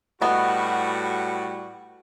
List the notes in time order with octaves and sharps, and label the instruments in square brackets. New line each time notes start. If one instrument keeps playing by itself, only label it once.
[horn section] A2 G3 F#4 [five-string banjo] B3 D#5